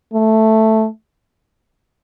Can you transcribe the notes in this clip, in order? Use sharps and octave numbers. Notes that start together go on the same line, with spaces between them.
A3